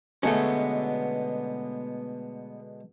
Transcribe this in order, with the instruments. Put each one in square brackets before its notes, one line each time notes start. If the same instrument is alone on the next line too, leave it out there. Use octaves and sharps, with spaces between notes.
[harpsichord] B2 D3 G#3 [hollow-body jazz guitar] A3 B3 C#4